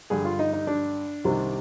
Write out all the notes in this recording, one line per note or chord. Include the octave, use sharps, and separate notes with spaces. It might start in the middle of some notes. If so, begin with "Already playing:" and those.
G2 D3 G3 G#4
F4
D#4
D#4
D4
C2 C3 D#3 G3